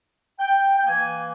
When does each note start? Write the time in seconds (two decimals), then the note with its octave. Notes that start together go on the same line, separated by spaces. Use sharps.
0.39 G5
0.77 G5
0.86 E3 A#3 G#5